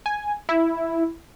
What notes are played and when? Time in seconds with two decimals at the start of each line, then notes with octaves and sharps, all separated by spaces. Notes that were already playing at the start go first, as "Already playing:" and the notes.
0.06 G#5
0.49 E4